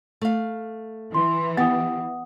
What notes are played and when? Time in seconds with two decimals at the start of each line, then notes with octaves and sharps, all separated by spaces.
0.21 A3 F5
1.14 E3 C6
1.57 B3 G4 F#5 D#6